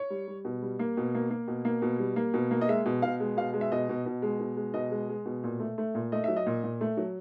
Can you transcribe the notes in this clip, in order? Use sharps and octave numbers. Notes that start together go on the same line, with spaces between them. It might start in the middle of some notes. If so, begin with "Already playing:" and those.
Already playing: C#5
G3
G3
B2
G3
A#3
B2
A#3
A#3
B2
A#3
B2
G3
A#3
B2
A#3
D#5
G#3 E5
B2
B2 F5
G#3
B2 F5
G#3
E5
B2 D#5
B2
B2
G#3
B2
G#3
B2 D#5
G#3
G#3
B2
A#2
A3
A3
A#2
A3 D#5
F#3 E5
D#5
A#2
A#2
A3
F#3